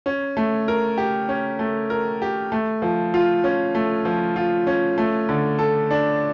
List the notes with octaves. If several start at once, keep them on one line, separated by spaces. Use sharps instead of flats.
C#4
A3
A#4
G4
C#4
A3
A#4
G4
A3
F3
F4
C#4
A3
F3
F4
C#4
A3
D3
A4
D4